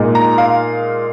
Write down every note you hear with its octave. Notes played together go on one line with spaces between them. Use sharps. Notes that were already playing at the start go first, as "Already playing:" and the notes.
Already playing: A#2 G#3 D#4
A#5
F5